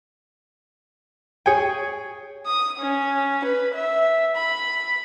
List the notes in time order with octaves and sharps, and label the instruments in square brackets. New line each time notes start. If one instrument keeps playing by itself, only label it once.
[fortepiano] G#4 G5 [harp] C#5 G#5
[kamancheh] D#6
C#4
B4
E5
B5